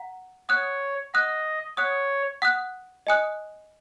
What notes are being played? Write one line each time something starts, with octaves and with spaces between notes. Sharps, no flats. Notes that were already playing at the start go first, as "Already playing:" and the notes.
Already playing: F#5 A#5
C#5 F#5 D#6 F#6
D#5 F#5 D#6 F#6
C#5 F#5 D#6 F#6
F#5 D#6 F#6
D#5 G#5 D#6 F#6